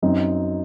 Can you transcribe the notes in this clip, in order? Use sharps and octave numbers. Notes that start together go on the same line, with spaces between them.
F#2 F#3 C4 D#4